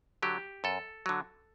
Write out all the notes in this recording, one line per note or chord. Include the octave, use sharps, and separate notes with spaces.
D3 F#3 G4
F#2 A4
D3 F#3